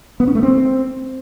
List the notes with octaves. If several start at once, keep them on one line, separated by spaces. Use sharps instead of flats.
B3
C#4
A3
C4